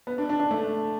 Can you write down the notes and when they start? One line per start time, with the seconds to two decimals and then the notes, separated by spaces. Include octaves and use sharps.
0.07 B3
0.18 D4
0.30 D4
0.40 D4
0.51 A3